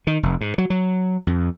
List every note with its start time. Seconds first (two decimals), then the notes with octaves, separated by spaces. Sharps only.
0.07 D#3
0.23 F1
0.41 G#2
0.58 F#3
0.70 F#3
1.27 F2